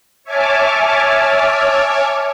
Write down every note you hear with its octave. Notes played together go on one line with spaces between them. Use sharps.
C#5 E5 G#5 A5 D6 F6